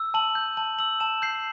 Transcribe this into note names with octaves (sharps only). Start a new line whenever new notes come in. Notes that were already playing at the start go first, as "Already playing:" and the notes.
Already playing: E6
A5 F#7
G6
A5 F#7
E6 F#7
A5 E7
G6 C7